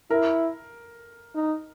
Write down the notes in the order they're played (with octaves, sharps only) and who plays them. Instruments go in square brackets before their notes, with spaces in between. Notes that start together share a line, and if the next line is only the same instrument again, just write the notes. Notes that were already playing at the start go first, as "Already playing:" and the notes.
[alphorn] E4 [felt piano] A#4
[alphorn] D#4